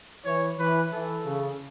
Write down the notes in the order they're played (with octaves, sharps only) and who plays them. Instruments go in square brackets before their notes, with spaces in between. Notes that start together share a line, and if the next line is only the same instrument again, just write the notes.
[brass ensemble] E3 [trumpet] C#5
[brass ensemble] E3 [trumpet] B4
[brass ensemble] E3 [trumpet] A4
[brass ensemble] C#3